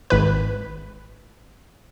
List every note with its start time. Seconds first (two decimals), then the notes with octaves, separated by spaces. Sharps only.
0.10 G#1 B4